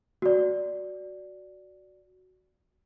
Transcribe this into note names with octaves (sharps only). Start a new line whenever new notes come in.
F#4 D5